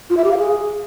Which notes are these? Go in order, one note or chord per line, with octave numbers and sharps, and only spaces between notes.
F4
E5
G4
F5
G#4